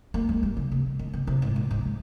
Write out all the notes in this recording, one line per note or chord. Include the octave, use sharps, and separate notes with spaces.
A#3
G#3
G3
C#3
C3
D#3
C#3
C3
G#2
A#2
G#2